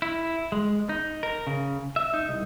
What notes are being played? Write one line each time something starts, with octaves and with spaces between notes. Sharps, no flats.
E4
G#3
D#4
A#4
C#3
E5
D#4
C2